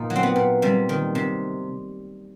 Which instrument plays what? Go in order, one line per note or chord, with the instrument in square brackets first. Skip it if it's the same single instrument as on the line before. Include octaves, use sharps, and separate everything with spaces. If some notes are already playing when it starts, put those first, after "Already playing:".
Already playing: [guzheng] A#2 D#4
F#3
C4
B3
A#2
C3 G3
D#3
C3